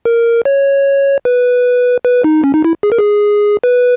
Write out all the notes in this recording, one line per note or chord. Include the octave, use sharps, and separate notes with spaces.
A#4
C#5
B4
B4
D#4
C#4
D#4
E4
G#4
A#4
G#4
B4